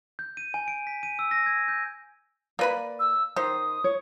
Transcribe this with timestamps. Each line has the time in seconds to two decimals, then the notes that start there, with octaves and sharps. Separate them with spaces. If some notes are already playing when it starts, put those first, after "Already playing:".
0.19 G6
0.37 D#7
0.54 G#5
0.68 D7
0.87 B6
1.03 D#7
1.19 E6
1.31 A#6
1.46 G#6
1.68 G6
2.59 A#3 B4 D5 B5
3.00 E6
3.36 D#3 C5 D#6
3.84 C#5